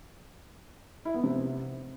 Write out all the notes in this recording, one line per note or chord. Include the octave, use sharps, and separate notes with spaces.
E4
B3
C3